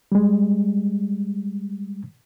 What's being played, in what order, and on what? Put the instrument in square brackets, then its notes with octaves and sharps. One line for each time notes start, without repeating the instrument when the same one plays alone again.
[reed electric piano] G3 G#3